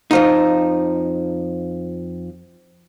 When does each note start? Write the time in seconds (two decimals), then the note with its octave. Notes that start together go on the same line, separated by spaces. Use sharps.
0.11 F2 F3 D#4